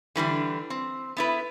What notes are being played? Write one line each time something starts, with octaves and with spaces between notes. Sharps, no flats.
D3 E3 G3 D4
C4
B3 E4 B4